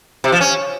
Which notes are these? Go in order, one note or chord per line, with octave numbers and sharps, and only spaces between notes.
C3
F3
C#4